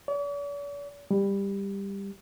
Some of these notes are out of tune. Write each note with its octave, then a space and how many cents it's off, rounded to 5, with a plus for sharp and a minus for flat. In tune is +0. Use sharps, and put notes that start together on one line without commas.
D5 -45
G3 +15